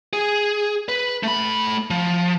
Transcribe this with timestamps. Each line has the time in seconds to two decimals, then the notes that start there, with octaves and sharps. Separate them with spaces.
0.13 G#4
0.89 B4
1.23 A3 B5
1.90 F3